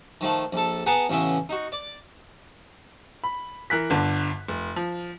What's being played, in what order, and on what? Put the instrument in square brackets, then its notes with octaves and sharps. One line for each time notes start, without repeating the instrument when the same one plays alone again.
[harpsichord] D#3 F3 A3
A#1 A4
B3 G#4 B4 F#5 A5 A#5
A1 C#3 B3 E4
D#4 F#4
D5
[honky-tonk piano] B5
E3 A#4 F#6 B6
G1 D3 A5
F1
F3